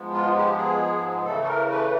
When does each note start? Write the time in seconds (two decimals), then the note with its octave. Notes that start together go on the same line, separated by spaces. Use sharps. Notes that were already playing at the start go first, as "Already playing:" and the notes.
Already playing: G#2 F3 G#3 B3
0.13 F4
0.36 G4
0.57 G#4
1.25 C#3 E3 A3 A4
1.43 A4
1.47 A#4
1.70 B4